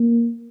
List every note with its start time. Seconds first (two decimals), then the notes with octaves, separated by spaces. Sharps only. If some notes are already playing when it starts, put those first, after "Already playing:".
Already playing: A#3